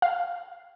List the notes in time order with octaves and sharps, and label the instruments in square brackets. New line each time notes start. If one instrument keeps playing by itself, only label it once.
[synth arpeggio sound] F5